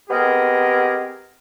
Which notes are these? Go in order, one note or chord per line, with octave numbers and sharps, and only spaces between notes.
G#3 B3 C4 G4 G#4 A#4